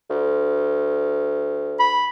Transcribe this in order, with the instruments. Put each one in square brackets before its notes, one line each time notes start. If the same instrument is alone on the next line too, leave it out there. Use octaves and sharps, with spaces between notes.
[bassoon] D2
[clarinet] B5